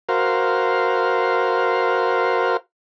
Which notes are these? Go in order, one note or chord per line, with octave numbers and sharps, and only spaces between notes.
F#4 A#4 C5 F5